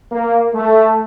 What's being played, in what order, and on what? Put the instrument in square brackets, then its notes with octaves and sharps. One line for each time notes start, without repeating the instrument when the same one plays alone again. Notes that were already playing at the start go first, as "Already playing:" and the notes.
[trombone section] A#3
A3